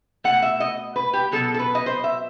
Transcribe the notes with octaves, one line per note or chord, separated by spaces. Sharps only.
B2 A3 F#5
E5
D#5
B4
G4
B2 F#3 B3 A4
A4
B4
D#5
C5
E5